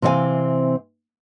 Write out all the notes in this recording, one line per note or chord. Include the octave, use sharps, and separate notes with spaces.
C3 E3 C4 D#5 F5 G#5